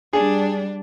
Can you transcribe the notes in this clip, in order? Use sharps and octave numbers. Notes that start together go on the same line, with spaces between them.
G3 D4 G#4